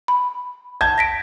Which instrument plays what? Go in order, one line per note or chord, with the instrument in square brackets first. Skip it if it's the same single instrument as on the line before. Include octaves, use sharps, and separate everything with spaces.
[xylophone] B5
[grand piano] A5 G6 G#6
[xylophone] A#6 B6 D7